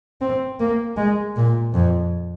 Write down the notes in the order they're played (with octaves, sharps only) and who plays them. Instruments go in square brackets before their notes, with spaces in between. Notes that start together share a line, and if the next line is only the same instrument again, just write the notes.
[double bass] C4
A#3
G#3
A#2
F2